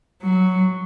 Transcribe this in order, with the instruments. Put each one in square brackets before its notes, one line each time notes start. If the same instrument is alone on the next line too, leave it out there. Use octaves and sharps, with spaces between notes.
[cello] F#3